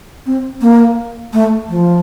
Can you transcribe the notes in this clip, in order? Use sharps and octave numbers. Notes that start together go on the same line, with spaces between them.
C4
A#3
A3
F3